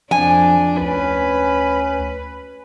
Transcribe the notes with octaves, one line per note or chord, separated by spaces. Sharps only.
F2 F3 D4 G#5
D2 C#4 B4